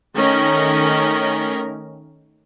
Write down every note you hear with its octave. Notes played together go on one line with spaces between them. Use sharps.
D#3 A3 C#4 A#4